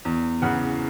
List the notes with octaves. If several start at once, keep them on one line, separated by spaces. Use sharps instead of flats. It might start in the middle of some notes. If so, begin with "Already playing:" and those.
E2
C#3 E3 F#5